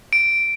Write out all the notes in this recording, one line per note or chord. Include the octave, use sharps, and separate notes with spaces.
D7